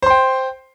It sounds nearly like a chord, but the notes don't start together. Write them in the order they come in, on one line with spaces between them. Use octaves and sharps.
C5 C6 G5